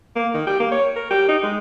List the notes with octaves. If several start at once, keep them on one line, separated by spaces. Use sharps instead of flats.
A#3
D#3
G4
A#3
C#5
A#4
G4
D#4
G#3